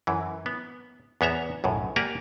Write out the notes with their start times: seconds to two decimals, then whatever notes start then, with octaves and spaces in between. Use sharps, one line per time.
0.07 F#2 E3
0.46 B3
1.21 E2 B3 C#5 E5 A#5
1.64 B1 F#2 A2
1.96 A#3 G4 D5 F#5 G#5 A#5